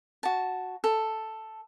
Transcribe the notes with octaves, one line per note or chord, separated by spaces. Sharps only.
F#4 A5
A4